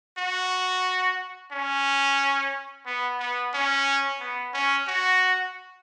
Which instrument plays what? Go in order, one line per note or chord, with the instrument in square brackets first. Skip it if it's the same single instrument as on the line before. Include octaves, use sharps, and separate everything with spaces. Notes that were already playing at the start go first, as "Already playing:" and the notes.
[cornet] F#4
C#4
B3
B3
C#4
B3
C#4
F#4